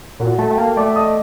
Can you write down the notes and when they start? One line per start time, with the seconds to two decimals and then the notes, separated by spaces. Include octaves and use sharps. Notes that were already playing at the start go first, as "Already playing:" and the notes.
0.20 A#2 F#4 F#5
0.38 A3 A4 A5
0.51 A3 G5
0.58 A#3 A4 A5
0.76 A3 D5 D6
0.96 D#5 D#6